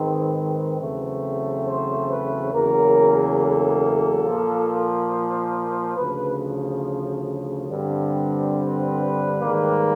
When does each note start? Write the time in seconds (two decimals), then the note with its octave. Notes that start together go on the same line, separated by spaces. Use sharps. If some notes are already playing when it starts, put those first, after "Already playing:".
Already playing: G#2 D#3 G#3 C4 B4
0.81 E2 C#3 F#3 A3 C4
1.67 C5
2.10 B4
2.53 E2 C#3 F#3 A#3 A#4
3.40 A4
4.25 A#2 F3 A#3
5.97 D2 C#3 F3 B4
7.69 G2 D3 G3 C4
8.56 B4
9.41 G#2 D#3 G3 A#3